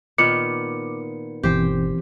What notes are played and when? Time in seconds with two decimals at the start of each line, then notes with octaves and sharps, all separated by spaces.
0.18 A#2 D#3 B3 D6 C#7
1.43 G1 B2 E3 C4 G4 C5